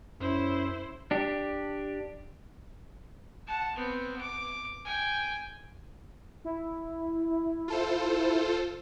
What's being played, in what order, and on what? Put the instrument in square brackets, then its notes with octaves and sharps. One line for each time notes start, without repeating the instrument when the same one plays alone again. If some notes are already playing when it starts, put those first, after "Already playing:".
[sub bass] F#2 [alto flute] C#4 [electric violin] E4 C5
[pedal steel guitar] D4 G4
[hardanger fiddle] F#5 A5
B3 C4
D6
G5 G#5
[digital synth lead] E4
[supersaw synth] F4 A4 C5